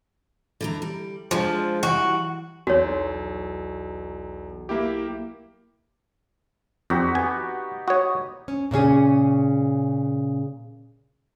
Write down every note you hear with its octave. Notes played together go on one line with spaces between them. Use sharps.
D3 E3 A#5
G3
F3 G#3 D4
E3 F#3 G3 F#4
B1 E2 F#4 C#5
A#3 E4 G4
F2 D#4 F#4 G4
B3 G#5
F#4 C#5 D#6
C#4
A#2 C#3 C#4 G#4